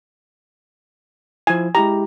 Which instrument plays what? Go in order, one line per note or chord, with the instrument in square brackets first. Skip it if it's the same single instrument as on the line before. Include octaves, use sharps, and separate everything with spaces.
[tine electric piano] F3 E4 [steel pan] G#5
[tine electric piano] G#3 E4 G4 [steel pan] A#5